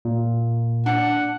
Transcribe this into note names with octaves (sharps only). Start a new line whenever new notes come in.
A#2
D4 F#5